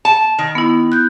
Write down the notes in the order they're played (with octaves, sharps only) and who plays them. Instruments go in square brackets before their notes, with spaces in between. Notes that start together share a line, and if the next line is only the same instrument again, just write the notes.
[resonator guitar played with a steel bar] A5
D#3
[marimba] B3 E4
F#6 G6